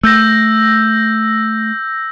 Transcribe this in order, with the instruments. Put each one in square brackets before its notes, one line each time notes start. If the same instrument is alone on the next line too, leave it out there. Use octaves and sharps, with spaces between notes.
[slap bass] A3 [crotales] E6 G6 A#6